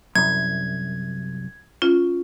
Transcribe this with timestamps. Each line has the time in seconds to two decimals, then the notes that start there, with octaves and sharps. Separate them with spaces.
0.15 C2 F#2 G#6
1.82 C#4 F4